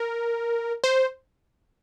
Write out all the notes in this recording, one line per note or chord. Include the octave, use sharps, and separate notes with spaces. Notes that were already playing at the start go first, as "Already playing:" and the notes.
Already playing: A#4
C5